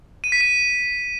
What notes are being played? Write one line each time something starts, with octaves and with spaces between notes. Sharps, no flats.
D#7
B6
D#7